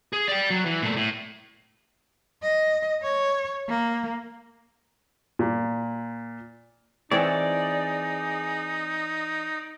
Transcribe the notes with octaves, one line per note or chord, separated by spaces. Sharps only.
G#4
D5 G5
F#3
E3
A#2 A3
A2
D#5
C#5
A#3
A#2
E3 C4 D#4 G#4 C#5 D5